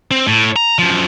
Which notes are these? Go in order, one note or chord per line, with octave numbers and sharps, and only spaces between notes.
C4
A2
A#5
F#2 F3